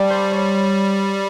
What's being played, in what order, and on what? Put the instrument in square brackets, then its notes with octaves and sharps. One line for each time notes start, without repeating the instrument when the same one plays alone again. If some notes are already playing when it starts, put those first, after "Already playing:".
Already playing: [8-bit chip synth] G3 [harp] D5 G5 A5
[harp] C5
C#5